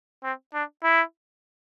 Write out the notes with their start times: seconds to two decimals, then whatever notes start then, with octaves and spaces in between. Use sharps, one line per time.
0.24 C4
0.54 D4
0.84 E4